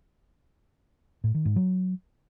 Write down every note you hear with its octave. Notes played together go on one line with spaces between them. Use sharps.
A2
D#3
G#2
F#3